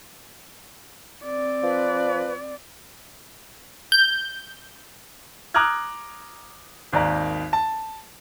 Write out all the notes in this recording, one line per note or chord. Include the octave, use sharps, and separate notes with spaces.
C4 D5
F3 B4
G6
A#5 D6 D#6 F6 F#6 G#6
G#1 D#2 D5 A#5
A5